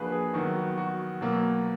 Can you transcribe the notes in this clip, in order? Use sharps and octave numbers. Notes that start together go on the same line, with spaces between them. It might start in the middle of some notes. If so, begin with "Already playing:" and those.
Already playing: F3 A#3 D4 F#4 G#4 B4
G#4
D#3 F#3 B3 F#4
F#4
F#4
B2 F#3 A#3